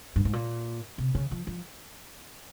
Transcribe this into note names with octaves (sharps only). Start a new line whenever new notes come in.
G2
G#2
A#2
C3
C#3
F3
F3